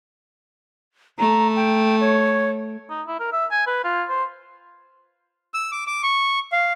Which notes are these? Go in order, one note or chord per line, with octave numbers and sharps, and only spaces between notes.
A3 A#5
G5
C#5
D#4
E4
A#4
E5
G#5
B4
F4
C5
E6
D6
D6
C#6
F5